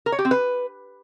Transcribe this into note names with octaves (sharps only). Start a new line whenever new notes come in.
A#4
C#5
G4
C4
B4